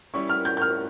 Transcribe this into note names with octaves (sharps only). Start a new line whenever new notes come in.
G3 C#4 E4 C#6
F6
G6
G6
F6